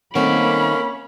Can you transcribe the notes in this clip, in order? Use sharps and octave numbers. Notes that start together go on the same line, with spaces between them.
D#3 A3 A#3 C4 C#4 A#4 F#5 B5